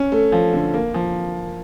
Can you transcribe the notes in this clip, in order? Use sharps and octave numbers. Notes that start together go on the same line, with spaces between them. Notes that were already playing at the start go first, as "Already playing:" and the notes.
Already playing: C#4
A3
F3
D3
A#3
F3